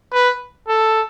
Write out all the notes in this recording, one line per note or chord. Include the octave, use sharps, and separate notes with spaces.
B4
A4